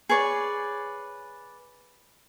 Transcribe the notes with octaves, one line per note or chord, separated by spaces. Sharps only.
G#4 B4 C#5 D5